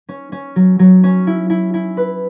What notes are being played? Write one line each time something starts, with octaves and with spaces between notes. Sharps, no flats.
C#4
C#4
F#3
F#3
C#4
E4
E4
E4
B4